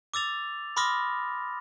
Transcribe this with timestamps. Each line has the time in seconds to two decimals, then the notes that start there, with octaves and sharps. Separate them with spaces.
0.14 D6 E6 A6 F7
0.77 B5 C6 D6 D#6 F6 A#6